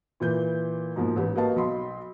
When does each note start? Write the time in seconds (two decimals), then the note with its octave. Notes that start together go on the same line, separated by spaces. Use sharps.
0.20 A#2 E3 B4 G6
0.96 G#2 B2 F3 A#3
1.16 A1 G4 B4
1.35 A#3 F#4 B4 D#5 F5 A5
1.56 B1 D#5 B5 C6